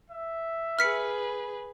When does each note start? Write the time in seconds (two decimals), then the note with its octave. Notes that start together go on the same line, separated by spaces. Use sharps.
0.10 E5
0.79 G#4 B4 F6 B6 C#7